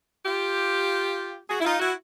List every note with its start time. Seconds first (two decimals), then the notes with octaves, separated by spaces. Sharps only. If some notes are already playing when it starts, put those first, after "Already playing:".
0.24 F4 G4
1.49 F#4 G#4
1.60 E4
1.64 D#4 F4
1.80 E4 F#4